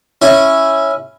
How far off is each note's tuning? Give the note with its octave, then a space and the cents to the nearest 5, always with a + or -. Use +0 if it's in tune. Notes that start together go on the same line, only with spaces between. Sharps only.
C#4 -5 E4 +0